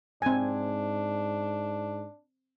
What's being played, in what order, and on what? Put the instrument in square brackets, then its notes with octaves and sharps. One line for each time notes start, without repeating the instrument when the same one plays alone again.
[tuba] G#2 [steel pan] C4 G#5 [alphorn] D4